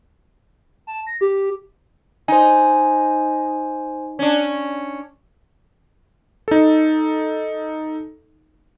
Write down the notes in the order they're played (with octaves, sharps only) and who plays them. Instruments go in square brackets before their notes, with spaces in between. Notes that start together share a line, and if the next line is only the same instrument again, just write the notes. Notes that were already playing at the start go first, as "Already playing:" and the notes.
[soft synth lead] A5
A#6
G4
[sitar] D#4 [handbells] C5 G#5
[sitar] C#4 D4
[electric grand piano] D#4 A4